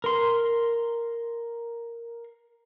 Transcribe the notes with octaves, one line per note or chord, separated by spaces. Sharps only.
A#4 C6